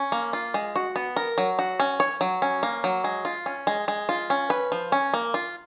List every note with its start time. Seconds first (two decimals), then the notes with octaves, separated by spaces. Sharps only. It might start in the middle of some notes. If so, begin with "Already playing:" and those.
Already playing: C#4
0.12 A#3
0.33 F4
0.54 G#3
0.76 F#4
0.96 B3
1.16 A#4
1.38 F#3
1.59 F#4
1.80 C#4
2.00 C#5
2.21 F#3
2.42 C#4
2.63 A#3
2.84 F#3
3.04 G#3
3.25 F4
3.46 C#4
3.67 G#3
3.88 G#3
4.09 F4
4.30 C#4
4.50 B4
4.72 F3
4.92 C#4
5.14 A#3
5.34 F4